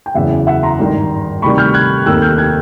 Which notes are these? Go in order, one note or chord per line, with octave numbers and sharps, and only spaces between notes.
G5
F#1 E2 C#3 E3 E5 F#5
E5 F#5
A#5 C6
G#1 G2 D#3
D2 C3 D#3 G3 B5 C#6
F6 G6
F#6 G#6
F1 D#2 D#3 E6 F#6
F6 G6
F#6 G#6